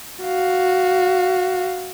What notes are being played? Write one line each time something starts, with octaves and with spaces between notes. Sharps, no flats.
F#4 F5